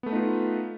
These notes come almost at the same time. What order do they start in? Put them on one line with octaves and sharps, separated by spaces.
B3 A3 B4 D#4 F4